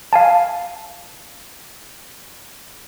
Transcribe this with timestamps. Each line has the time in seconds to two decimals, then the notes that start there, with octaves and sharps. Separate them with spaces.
0.13 F5 G#5 A5